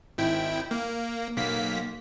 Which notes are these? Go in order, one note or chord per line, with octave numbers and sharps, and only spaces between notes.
G#1 E4 G5
A#3
B1 A#3 B6